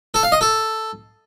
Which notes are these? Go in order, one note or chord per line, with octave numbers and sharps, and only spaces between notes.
A4
F5
D#5
A4